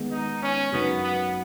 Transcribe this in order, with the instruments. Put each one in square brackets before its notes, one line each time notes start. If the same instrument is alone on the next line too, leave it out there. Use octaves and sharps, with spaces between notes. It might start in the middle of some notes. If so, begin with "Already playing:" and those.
Already playing: [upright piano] D#3 G#3 B3
[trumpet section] D#4
C#4
[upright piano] F#2 F#3 D#4 B4 [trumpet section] B3
[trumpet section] B3